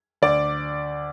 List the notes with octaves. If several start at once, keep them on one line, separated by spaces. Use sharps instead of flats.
D2 D5